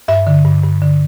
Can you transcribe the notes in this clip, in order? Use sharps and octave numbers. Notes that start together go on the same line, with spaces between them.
G2 E5
D3
G2
G2
D3